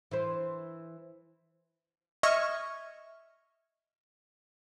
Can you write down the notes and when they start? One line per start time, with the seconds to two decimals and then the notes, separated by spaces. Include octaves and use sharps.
0.11 E3 E4 C5
2.23 D#5 E5 C#6 F6 G#6